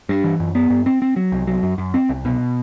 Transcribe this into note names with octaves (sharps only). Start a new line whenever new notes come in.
G2
E3
F#2
B3
G2
C4
C4
F#3
C2
F#3
F#2
F#2
C4
C2
B2